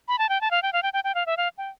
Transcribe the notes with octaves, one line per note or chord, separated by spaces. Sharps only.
B5
A5
G5
A5
F5
G5
F5
G5
G5
G5
F5
E5
F5
G5